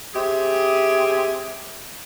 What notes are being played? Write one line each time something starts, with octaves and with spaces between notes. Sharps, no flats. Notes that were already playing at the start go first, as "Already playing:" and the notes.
C4 G4 G#4 E5